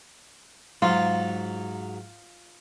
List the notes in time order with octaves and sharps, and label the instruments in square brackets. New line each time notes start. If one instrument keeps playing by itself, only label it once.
[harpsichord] G#2 F#3 [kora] F4